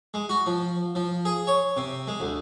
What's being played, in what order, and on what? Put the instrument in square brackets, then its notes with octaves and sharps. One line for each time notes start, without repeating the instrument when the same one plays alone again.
[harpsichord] G#3
F#4
F3
F3
G#4
C#5
C3
G#3
D2